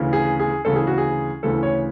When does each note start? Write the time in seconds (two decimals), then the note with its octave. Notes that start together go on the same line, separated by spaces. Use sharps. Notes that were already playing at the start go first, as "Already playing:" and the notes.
Already playing: D2 C#3 E3
0.13 G#4
0.40 G#4
0.65 D2 C#3 E3 A4
0.76 G#4
0.87 F#4
0.98 G#4
1.43 D2 C#3 E3 A4
1.63 C#5